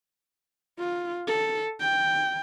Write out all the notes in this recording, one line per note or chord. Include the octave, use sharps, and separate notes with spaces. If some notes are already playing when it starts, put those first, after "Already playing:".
F4
A4
G5